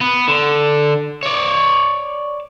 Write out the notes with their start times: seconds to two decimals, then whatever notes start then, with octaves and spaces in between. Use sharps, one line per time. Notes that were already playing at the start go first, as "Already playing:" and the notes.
0.01 B3
0.28 D3
1.23 C#5 D5